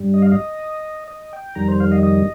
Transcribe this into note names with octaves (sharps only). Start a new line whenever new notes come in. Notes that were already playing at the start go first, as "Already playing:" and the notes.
Already playing: G2 G3
D#5
F5
D#5
D#5
G5
F2 D#3 G3 A#5
C5
F5
D#5
D#5